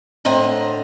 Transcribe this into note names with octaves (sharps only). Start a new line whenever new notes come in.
A2 D3 C4 D#5 A#5